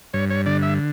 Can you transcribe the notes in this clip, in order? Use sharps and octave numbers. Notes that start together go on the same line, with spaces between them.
G2 C#5
C#5
D3 D5
E5